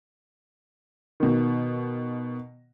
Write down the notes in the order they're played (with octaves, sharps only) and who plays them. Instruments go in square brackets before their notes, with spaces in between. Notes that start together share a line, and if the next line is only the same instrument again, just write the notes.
[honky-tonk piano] B2 D#3